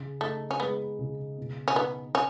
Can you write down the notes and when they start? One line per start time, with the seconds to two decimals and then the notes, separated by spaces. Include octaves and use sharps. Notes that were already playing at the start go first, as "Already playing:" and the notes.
Already playing: C#3
0.21 A3 D#4
0.51 C#4
0.60 G#3 B3
0.99 C#3
1.38 B2
1.68 C#4
1.76 B3 D#4
2.15 C#4